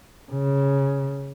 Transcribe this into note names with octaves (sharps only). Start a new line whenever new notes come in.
C#3